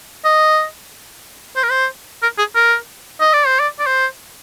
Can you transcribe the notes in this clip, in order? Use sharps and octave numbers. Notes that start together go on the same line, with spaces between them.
D#5
C5
A#4
C5
A#4
G#4
A#4
D#5
D5
C5
D5
D5
C5